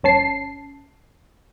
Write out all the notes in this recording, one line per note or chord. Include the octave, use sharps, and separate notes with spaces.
G1 C#4 A5 C7